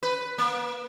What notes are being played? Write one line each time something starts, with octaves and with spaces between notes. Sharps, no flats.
B4
A#3